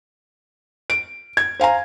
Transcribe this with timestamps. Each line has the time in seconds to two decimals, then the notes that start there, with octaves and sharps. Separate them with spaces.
0.90 D7
1.37 G#6
1.60 C5 F5 G#5 A#5